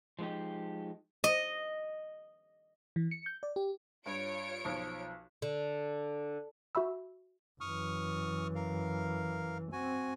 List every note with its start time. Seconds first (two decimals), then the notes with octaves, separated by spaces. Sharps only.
0.19 F3 G#3 B3 D#4 G4
1.24 D#5
2.96 E3
3.11 C#7
3.26 G6
3.43 D5
3.56 G4
4.06 G2 F4 C#5 D7
4.65 B1 F3
5.42 D3
6.75 F#4 E5 B5 E6
7.61 F#2 E3 C#6 D#6 F6
8.55 A#4 F5
9.72 C4 F#4 G#5